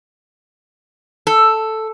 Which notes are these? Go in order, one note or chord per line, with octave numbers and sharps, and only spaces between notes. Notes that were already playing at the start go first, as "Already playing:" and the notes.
A4